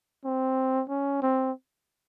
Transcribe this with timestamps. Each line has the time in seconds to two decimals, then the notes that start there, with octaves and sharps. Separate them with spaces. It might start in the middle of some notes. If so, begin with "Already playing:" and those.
0.25 C4
0.89 C#4
1.22 C4